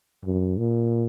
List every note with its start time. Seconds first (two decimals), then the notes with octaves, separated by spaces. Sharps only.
0.25 F#2
0.58 A#2